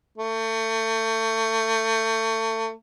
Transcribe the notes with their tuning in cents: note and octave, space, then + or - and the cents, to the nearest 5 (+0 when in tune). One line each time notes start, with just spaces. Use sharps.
A3 +30